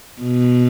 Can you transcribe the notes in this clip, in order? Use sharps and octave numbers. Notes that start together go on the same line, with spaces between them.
B2